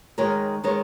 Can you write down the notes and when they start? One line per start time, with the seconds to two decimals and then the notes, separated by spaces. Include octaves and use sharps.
0.18 D#3 G#3 D#4 A#4 C#5
0.63 D#3 G#3 D#4 A#4 C#5